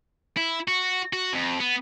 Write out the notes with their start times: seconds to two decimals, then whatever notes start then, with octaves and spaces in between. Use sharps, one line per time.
0.37 E4
0.68 F#4
1.13 F#4
1.33 F2
1.60 B3